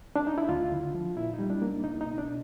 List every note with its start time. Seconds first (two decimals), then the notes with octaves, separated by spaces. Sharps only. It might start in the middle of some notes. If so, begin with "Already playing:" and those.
0.16 D4
0.27 D#4
0.38 E4
0.49 D2 F4
0.72 D3
0.95 F3
1.16 A#2 E4
1.34 D#4
1.39 G3
1.50 D4
1.62 A#3
1.67 D#4
1.84 C2 D#4
2.01 D#4
2.06 B2
2.18 D4